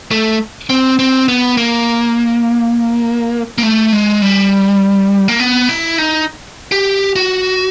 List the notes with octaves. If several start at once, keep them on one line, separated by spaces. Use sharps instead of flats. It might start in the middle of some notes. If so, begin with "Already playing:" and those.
A3
C4
C4
B3
A#3
A#3
A3
G#3
G3
A#3
B3
E4
D#4
G4
F#4